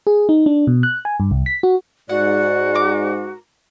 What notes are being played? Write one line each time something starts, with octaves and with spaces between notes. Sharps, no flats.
G#4
D#4
D4
B2
F#6
G#5
G2
C2
B6
F#4
G#2 F#4 D5 F#5
A#4 D6